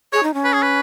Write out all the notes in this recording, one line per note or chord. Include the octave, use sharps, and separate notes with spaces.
G#4 C#5
D#4
C#4
B4
G#4
B4